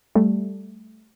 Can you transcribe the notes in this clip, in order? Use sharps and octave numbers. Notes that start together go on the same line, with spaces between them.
G3 A3